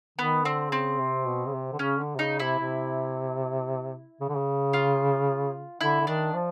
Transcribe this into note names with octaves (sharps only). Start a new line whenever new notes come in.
D#3 B3
D3 C4
C#3 C4
C3
B2
C#3
C3
D3
C#3 C#4
D3
C3
C#3 D#4
C3 E4
C3
C#3
D3
C#3
F4
D3 E4
D3
D#3 D4
F3